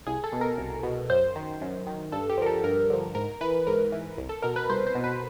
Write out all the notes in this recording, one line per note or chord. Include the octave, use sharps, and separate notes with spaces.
C2 G#4
A4
B2
A#4
C2
B2
F#2 C5
D#3
F#2
D#3
G2 A4
G4
D3 F3 A#4
A4
G2 A#4
D3 F3
G#2 A#4
E3 B4
G#2 A#4
E3
C2
A4
B2 A#4
B4
C2 C5
C5
B2
B4